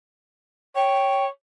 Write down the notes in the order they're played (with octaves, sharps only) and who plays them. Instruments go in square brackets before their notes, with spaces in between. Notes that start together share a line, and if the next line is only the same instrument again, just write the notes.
[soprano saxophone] C#5 [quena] G5